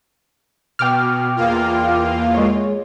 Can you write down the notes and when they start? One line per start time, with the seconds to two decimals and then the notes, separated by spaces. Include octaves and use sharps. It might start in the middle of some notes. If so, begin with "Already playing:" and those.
0.79 B2 G5 D6 F6
1.36 E2 A#3 F4
2.34 G#3 C#5